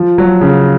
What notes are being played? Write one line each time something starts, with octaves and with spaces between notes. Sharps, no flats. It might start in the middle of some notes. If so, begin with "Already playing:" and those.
Already playing: F3
F#3
C#3